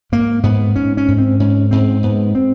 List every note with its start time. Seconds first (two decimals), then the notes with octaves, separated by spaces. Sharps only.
0.12 G#2 A#3
0.43 G#2 B3
0.76 G#2 C#4
0.97 C#4
1.08 G#2
1.18 C4
1.40 G#2 C#4
1.71 G#2 C4
2.03 G#2 B3
2.35 C4